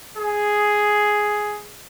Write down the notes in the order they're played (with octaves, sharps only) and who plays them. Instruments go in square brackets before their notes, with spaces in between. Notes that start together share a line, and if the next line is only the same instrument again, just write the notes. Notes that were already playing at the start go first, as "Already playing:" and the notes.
[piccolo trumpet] G#4